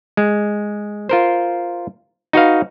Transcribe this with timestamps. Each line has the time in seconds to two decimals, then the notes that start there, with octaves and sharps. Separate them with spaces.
0.17 G#3
1.09 F4 A#4 C5
2.33 D#4 F#4 B4 F5